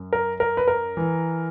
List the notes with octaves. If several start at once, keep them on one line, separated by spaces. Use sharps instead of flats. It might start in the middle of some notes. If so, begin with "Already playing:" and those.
Already playing: F#2
A#4
A#4
B4
A#4
E3